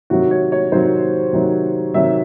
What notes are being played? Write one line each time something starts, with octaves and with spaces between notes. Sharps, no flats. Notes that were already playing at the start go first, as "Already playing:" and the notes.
C3 D#3 F#3 F#4
C#5
C#5
C3 D#3 F#3 C5
C3 D#3 F#3
C3 D#3 F#3 E5